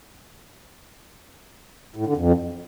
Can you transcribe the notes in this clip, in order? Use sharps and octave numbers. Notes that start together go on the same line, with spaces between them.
A2
D3
F2